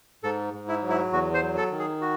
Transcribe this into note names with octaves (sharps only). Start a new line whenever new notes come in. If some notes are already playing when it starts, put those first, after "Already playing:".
G#2 A4
G#2
E4
F#3
E4
E2 F#4
C5
F#3
A4
D#3
G#4
F#4